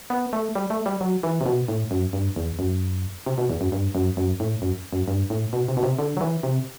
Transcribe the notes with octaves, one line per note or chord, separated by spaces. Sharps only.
B3
A3
G3
A3
G3
F#3
E3
C3
B2
A2
F#2
G2
E2
F#2
C3
B2
E2
F#2
G2
F#2
F#2
A2
F#2
F#2
G2
A2
B2
C3
B2
C3
D3
F#3
E3
C3